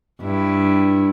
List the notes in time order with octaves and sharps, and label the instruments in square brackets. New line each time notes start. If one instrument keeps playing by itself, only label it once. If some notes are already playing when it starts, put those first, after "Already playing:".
[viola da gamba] G2 E4